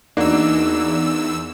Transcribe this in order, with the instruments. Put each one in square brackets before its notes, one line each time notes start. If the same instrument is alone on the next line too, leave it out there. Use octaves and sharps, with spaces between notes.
[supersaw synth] E2 E6 [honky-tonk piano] A#3 D4 F#4 [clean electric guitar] D#4